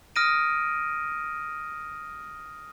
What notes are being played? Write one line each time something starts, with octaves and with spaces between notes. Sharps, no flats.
D#6 F6 A#6 D7 D#7